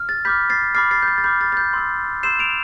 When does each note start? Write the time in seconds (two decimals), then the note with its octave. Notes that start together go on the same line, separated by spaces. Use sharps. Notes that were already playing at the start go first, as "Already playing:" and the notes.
Already playing: F6
0.09 A6
0.25 B5 D6 F6 G6 B6
0.50 A6 C7
0.75 B5 D6 F6 A6 C7
0.91 A6 C7
1.02 G6
1.08 A6
1.18 A6
1.24 B5 D6 F6 G6
1.41 A6
1.52 A6
1.57 G6
1.73 C6 E6 G6
2.23 C6 E6 G6 C7 E7
2.39 D7 F7